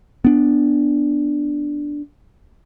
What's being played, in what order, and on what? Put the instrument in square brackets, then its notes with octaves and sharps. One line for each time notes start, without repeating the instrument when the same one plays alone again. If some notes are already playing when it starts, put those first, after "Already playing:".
[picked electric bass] B3 D4